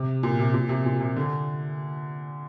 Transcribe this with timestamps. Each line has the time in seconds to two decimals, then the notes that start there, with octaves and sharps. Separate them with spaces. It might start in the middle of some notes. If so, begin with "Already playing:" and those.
Already playing: C3
0.23 A#2
0.39 C3
0.54 A#2
0.69 C3
0.86 A#2
1.01 C3
1.16 D3